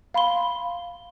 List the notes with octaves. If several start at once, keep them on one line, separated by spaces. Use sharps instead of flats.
F5 B5 C6 G7